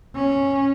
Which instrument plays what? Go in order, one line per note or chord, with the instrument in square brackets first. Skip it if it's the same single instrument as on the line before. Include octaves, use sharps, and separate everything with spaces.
[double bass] C#4